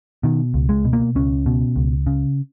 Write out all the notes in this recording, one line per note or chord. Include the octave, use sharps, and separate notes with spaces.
B2 D#3
C#2
G#3
B2
A#3
C#2 C#4
B2
C#2
C#3